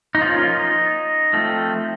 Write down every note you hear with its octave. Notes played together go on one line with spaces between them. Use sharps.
D#4
F3 A#3 C#4 F4
D#4
F3 A3 C4